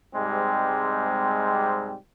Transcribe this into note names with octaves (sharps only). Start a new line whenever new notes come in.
G#2 C3 G3 G#3 C4